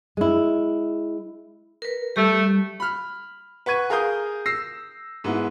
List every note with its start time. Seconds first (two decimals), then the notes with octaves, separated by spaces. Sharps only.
0.17 G#3 E4
1.82 A#4 B4
2.16 G3 A3 G4
2.80 B5 F6
3.66 B4 F#5 C#6 G#6 D#7
3.90 G#4 A#4 F5 A#5 D#6 G6
4.46 E6 A#6 C7
5.24 G#2 B3 E4